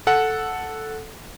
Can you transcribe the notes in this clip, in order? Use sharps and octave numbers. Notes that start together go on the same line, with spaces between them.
A4 F#5